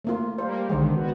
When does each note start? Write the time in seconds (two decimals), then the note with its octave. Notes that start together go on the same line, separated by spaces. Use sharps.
0.05 A3 A#3 F4
0.38 G3 A#3 C5
0.69 B1 D3 D#3 G#3 C5
0.96 B3 F#4